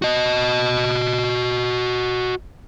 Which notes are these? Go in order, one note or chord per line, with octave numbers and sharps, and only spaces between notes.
F#4 D#5